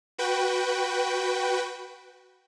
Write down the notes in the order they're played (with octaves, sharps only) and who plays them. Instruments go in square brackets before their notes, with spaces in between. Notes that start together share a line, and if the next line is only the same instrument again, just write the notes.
[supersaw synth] F#4 B4 G5